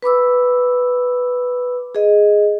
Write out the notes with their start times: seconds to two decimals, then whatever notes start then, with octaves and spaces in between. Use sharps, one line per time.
0.02 B4 B5 D6 E6
1.95 G#4 D#5